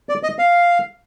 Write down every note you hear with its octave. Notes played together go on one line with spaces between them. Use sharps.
D5
D#5
F5